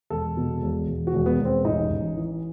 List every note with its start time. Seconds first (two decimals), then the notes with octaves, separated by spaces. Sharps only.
0.10 E1 A4
0.37 B2
0.62 E1
0.87 E1
1.07 F#4
1.13 E1
1.26 B3
1.39 E1
1.45 C4
1.64 A1 D#4
1.90 A1
2.16 E3